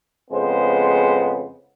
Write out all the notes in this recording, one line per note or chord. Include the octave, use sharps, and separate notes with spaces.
F2 C#3 G#3 B3 C5